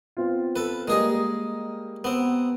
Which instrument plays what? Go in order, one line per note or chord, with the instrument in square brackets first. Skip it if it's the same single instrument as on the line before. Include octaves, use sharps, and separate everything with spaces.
[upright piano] B3 C4 F4
[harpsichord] A4 B4
[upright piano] G3 A#3 [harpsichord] G#3 G#4 D#5
[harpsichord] B3 C4